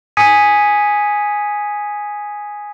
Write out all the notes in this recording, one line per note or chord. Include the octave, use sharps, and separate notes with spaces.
G#5 D#6 G#6 B6 C#7 D#7